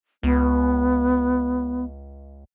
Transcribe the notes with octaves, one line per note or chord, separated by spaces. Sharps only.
C#2 B3